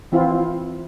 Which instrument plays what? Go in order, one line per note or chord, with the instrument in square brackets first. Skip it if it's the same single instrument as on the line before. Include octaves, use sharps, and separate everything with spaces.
[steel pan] E3 C4 E4 F4